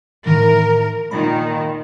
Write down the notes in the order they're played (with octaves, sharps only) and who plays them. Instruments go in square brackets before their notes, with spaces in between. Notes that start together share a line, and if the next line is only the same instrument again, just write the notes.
[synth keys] A2 D#3 E3 [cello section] A#4
[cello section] A#2 D#3 [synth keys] B5